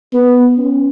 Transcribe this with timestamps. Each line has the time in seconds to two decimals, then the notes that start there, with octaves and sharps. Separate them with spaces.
0.13 B3
0.57 C#4